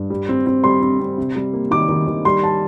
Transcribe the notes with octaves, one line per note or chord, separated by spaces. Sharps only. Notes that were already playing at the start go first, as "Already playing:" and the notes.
Already playing: G2
G3
C4
C4
G3 C6
C4
C4
C3
G3
A#3
D#3 D6
D#3
D#3
G3 C6
A5